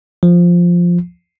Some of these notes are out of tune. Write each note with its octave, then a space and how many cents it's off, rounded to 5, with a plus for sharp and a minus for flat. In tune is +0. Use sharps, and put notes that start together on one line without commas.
F3 +0